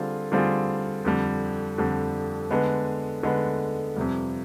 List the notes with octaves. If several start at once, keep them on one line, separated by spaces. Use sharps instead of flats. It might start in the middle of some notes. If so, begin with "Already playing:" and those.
Already playing: D3 G3 C4 F4 G#4
D3 G3 C4 F4 G#4
F2 D3 G3
F2 D3 G3
D3 G#3 B3
D3 G#3 B3
F2 C3 G3